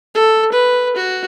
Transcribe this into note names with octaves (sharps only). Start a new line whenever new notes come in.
A4
B4
F#4